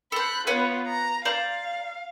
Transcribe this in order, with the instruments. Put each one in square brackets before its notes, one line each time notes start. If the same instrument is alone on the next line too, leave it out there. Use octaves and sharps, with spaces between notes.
[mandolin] A4 C5 [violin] B5 F#6
[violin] B3 F4 [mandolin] B4 C#5 F#5
[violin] A#5
[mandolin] C5 D5 A#5 [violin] F5